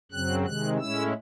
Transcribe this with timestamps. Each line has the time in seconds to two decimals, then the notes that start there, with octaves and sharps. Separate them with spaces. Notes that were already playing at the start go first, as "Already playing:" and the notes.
0.11 F#2 C#3 F#3 C4 F#6
0.45 C3 D#3 G#3 F#6
0.79 A2 G#3 C#4 E4 E6